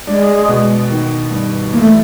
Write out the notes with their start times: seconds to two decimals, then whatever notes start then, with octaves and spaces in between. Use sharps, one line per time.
0.07 G#3 D4
0.48 B2
0.91 D#3
1.31 G2
1.72 E3 A#3
1.80 A3